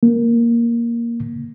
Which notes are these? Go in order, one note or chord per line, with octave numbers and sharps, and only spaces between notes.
A#3